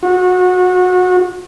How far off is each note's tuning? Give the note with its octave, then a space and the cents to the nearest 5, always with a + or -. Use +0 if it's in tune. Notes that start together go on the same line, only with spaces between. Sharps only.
F#4 -25